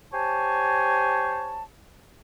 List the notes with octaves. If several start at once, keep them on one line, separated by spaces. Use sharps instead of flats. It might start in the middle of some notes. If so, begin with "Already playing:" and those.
G4 C5 C#5 G#5 A5